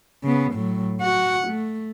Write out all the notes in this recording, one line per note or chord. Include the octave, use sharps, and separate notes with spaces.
C#3 B3
A2 F#3
F#4 F#5
A3